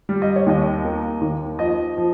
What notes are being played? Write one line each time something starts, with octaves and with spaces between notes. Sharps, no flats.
G3
D#5
C#5
D#2 D#5
A#3
D#2
F3 D#5
F3